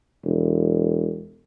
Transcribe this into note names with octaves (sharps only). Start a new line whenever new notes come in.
E1